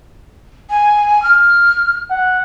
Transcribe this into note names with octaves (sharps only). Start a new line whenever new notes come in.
G#5
F6
F#5